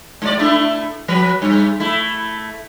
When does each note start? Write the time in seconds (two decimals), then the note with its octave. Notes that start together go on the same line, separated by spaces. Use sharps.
0.22 G#2 D5
0.39 A3 D4 E4
1.08 F3 F#3 B4
1.42 G2
1.80 A3 E4